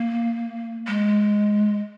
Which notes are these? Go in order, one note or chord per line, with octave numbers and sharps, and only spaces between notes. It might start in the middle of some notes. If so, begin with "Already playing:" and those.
Already playing: A#3
G#3